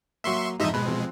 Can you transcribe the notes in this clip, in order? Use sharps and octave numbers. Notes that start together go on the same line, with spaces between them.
F#3 A#3 E5 C6 C#6
F2 G#2 D#4 D#5 E5
B2 G#3 B5 F#6
F3 C4